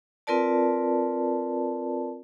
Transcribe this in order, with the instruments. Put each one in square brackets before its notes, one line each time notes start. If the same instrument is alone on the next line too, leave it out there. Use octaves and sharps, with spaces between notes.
[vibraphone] C4 F4 A#4 B4 D5 A5